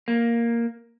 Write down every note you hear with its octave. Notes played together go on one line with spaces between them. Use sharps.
A#3